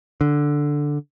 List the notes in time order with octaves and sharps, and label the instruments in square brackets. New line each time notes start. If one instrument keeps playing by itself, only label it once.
[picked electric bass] D3